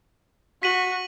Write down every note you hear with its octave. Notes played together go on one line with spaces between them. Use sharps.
F#4 B6 D#7 F#7